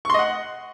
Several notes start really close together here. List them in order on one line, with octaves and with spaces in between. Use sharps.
C#6 C6 D#5 F#5